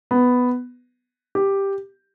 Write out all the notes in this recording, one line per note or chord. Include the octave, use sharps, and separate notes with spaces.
B3
G4